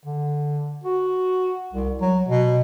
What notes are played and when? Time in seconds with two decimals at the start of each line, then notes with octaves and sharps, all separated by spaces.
0.06 D3
0.84 F#4
1.73 C2
2.01 F#3
2.28 B2